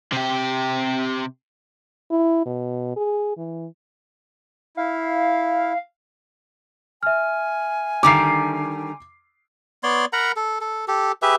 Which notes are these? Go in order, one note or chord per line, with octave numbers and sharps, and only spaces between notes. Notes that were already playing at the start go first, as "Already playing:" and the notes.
C3 G4
E4
B2
G#4
E3
E4 F5
E5 G#5 F6
D3 D#3 G3 D6 C7
B3 C#5 D5 C6
A#4 F#5 A#5 B5
A4
A4
G4 A4
G4 G#4 B4 E5